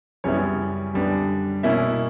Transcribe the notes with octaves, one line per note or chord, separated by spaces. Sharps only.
F#2 C#3 G3 B3 C#4 E4 C#5
F#2 D3 G3 B3 D4
B2 A#3 C#4 E4 E5